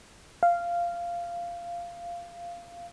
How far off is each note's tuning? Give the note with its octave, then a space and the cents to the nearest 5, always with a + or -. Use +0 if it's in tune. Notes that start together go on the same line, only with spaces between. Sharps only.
F5 -10